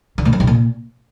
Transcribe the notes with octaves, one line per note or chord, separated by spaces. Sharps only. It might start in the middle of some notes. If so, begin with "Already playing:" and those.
D3
A2
F#2
C3
A#2